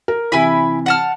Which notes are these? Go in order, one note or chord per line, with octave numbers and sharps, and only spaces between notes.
A#4
C3 E3 E4 G#5 B5
F#5 A5 F6